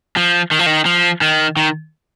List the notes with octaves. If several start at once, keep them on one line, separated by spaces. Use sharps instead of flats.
F3
D#3
F3
D#3
F3
D#3
D#3